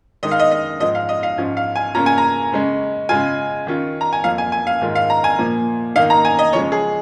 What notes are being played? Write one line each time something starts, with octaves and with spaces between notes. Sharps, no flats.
D#3 G#3 D#4 D#5
F5
D#5
D#5
G#2 F3 G#3 D#5
F5
D#5
F5
G#2 F3 C#4 F4
F5
G#5
C#3 A#3 C#4 F4 A#5
G#5
A#5
C#3 G#3 C#4
C#3 G#3 F4 G#5
D#3 C#4 F4
A#5
G#5
F2 F3 A#3 F5
G#5
G#5
F5
G#2 D#3 G#3 F4
F5
A#5
G#5
A#2 F3 A#3
D#3 A#3 D#4 F5
A#5
G#5
D#5
C#3 F3 G#3 C#5
G#4